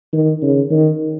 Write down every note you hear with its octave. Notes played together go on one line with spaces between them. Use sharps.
D#3
C#3
D#3